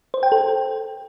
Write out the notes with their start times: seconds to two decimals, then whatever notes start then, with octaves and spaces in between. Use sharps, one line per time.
0.14 C5
0.23 G5
0.32 A4